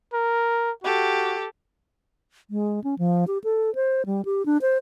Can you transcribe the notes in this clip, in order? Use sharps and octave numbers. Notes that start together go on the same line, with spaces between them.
A#4
F#4 G4 A4
G#3
C#4
F3
G4
A4
C5
G3
G4
D4
C5